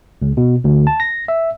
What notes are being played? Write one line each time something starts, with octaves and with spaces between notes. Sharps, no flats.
C#2
B2
D2
A5
A#6
E5